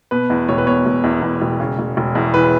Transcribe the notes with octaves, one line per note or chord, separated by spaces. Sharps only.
B2 B4
E2
E1 C#5
B4
B2 C#5
E1
E2
E2
E1
C#3
E1
E1
E2
E3 B4